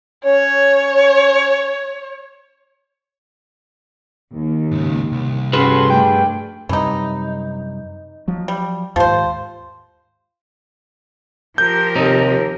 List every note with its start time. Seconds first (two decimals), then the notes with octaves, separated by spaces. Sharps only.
0.25 C#4 C#5
4.34 D#2
4.71 G#2 C#3
5.12 C2
5.53 G2 C#4 F#4 G#4 A4 B4 C6
5.90 A3 D4 G5
6.69 F#2 C3 E3 G3 D#4
8.28 F3 F#3
8.48 G3
8.96 D#2 G#2 F3 C5
11.58 F3 G4 A#4 G6
11.96 D#2 C3 D#4